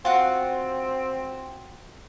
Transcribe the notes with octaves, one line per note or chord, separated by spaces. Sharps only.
C4 F4 F#4